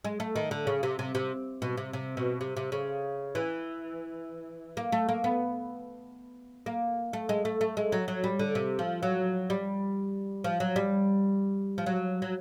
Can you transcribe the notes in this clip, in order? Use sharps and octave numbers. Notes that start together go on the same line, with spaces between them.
G#3
A3
D#3
D3
C#3
C3
C3
C3
B2
C3
C3
B2
C3
C3
C#3
E3
A#3
A3
A#3
B3
A#3
A3
G#3
A3
A3
G#3
F#3
F#3
G3
D3
C3
F3
F#3
G3
F3
F#3
G3
F3
F#3
F#3